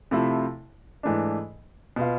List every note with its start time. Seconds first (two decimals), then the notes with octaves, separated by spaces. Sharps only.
0.11 C3 F3 A3 E4
1.03 G#2 E3 A3 D4
1.96 B2 B3 F4